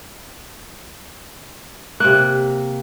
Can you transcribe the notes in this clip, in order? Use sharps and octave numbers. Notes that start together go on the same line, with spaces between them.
C3 A#3 F#6